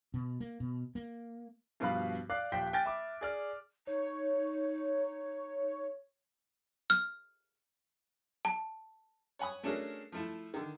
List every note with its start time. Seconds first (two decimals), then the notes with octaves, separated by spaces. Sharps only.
0.14 B2
0.40 A#3
0.60 B2
0.95 A#3
1.80 G2 B2 F3 B4 F5 B5
2.30 D5 F5 D6 F#6 C7
2.52 D#1 F3 C5 G5 B6
2.73 G5 G#5 F6 A6
2.85 E5 B5 D6
3.21 G#4 D5 F6
3.87 D#4 C#5
6.90 F6
8.45 A5
9.39 C#5 F#5 G#5 B5 D#6
9.63 A3 C#4 D4 F#4 G#4 A#4
10.12 F3 A3 E4
10.54 D3 D#3